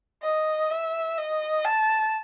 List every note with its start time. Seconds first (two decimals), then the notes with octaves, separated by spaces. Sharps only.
0.23 D#5
0.71 E5
1.18 D#5
1.64 A5